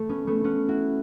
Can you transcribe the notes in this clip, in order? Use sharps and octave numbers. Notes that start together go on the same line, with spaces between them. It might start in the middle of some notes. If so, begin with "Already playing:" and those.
Already playing: A3
B3 C#4
A3 B3
B3 C#4
E4 F#4